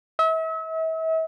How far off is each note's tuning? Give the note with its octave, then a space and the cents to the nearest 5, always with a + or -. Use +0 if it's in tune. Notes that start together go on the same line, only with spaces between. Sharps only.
E5 -40